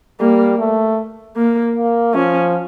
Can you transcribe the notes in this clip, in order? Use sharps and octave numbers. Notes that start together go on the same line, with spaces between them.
G3 A#3
A3
A#3
A#3
F3 C#4